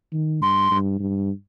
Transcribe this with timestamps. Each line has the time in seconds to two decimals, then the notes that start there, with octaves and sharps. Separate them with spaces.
0.13 D#3
0.42 G2 C6
0.71 G2
1.00 G2